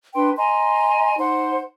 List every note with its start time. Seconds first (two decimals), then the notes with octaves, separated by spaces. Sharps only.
0.15 D4 B4 G5 C6
0.37 D#5 G#5 A#5 C6
1.18 D#4 C5 F#5 C6